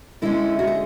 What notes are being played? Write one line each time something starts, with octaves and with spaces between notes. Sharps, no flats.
D3 G#3 C#4 E4
F#4
G#4